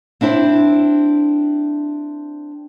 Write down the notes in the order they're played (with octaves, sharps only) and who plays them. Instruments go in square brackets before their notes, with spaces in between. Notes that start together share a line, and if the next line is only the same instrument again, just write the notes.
[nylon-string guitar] C4 D4 E4 C5